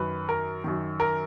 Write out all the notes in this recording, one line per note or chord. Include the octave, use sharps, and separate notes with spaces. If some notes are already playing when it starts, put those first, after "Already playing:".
Already playing: F#2 D#3 B4
A#4
F#2 D#3
A#4